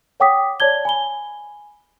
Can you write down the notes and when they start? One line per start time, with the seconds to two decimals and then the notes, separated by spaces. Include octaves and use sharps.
0.20 C#5 F#5 G5 D6 D#6 B6
0.60 C#5 D5 A5 G#6 G7
0.85 G#5 B5 G7